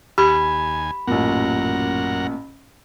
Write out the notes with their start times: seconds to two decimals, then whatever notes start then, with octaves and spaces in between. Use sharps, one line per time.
0.18 D#2 G4 G#5 B5
1.07 A1 F#2 A#2 A#4 F#5